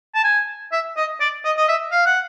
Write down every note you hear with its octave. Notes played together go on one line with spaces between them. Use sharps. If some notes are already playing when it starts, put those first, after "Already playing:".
A5
G#5
E5
D#5
D5
D#5
D#5
E5
F5
F#5